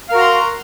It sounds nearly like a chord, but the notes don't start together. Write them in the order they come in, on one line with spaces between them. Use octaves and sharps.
F5 A#4 F#4 A#5 C6